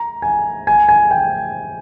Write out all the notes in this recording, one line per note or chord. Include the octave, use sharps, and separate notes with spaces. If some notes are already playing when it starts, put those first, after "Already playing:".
Already playing: A#5
G#5
G#5
G#5
G5